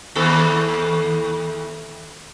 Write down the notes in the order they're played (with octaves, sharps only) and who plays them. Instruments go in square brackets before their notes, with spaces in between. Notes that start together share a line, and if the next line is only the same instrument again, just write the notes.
[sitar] D#2 E3 A4